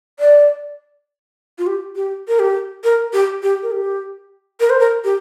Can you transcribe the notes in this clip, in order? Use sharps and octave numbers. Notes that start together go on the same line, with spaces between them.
D5
F4
G4
G4
A#4
G4
A#4
G4
G4
A#4
G4
A#4
C5
A#4
G4